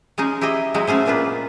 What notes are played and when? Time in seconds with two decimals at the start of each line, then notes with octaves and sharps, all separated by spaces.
0.18 G#3 C#4 D#4 G#4
0.41 E4 G4 G#4 D#5 E5
0.74 F#3 G#3 D#4 E4 F#4
0.87 A3 C#4 G#4 C5
1.06 A#2 A#3 D4 F4 B4